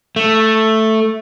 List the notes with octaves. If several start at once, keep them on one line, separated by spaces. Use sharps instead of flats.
A3